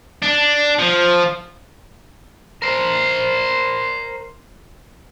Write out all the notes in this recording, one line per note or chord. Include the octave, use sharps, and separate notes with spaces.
D4
F3
A#4 C5